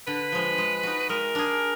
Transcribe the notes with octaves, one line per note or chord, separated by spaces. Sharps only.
D3 B4
F3 G#3
G#3
D#4 F#4
G#3 A#4
D4 G#4